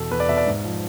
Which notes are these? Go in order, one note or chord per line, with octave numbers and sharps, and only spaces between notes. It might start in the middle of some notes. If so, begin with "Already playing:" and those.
Already playing: E2 B2 A4
E2 B4
D5
B2 E5
D5
G#2
F3